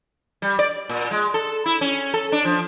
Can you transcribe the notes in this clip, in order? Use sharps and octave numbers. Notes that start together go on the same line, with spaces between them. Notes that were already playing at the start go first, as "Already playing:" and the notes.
G3
D5
A#2
G#3
A4
E4
C#4
A4
D4
F3